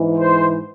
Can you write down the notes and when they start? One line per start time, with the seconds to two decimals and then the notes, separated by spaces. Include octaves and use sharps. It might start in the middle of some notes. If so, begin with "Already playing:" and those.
Already playing: G#2 E3
0.18 C5